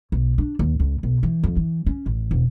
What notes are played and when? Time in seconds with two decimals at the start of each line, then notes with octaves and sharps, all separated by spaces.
0.12 B1
0.38 D4
0.59 D#2
0.80 C#2
1.03 B1
1.23 E3
1.44 F2
1.56 E3
1.86 C#4
2.06 A1
2.31 E1